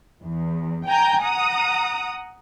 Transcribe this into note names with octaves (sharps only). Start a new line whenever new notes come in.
E2
G5 G#5 A#5 G6
F#5 A#5 D#6